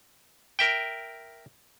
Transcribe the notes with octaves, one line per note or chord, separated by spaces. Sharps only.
A#4 E5 G5